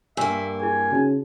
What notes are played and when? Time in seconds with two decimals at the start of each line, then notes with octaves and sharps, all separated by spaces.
0.17 G2 A#3 G4 E5 G#5 E6
0.60 E4 G#4 G#5
0.91 C#3 D#4 F#4